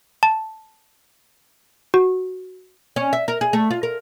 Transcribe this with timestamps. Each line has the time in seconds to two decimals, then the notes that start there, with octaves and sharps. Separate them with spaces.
0.23 A5
1.94 F#4
2.96 C#4
3.13 E5
3.28 A#4
3.41 G#4
3.53 A3
3.71 F4
3.83 A#4